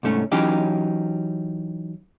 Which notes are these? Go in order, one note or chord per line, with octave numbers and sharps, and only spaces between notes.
C2 G#2 A3 C#4
E3 F#3 C#4 D#4 G4